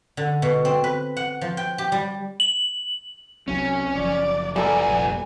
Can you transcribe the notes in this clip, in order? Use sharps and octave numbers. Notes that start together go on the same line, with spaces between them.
D3
B2
C4
B4
F#5
F3
G5
G4
G3
F#7
C2 F#3 C4 C#4
F#1 F3 D5
G3 B3 A4 A#4 D5 G#5
F1 A#1